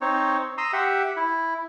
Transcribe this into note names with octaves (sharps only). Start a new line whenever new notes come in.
C4 D#4 C#5
A#5 C6 D#6 E6
G4 E5 F#5
E4